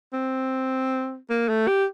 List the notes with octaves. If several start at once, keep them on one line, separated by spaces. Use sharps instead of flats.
C4
A#3
A3
G4